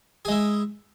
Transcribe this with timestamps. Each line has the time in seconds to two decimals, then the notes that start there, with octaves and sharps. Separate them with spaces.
0.25 G#4
0.28 G#3
0.31 E4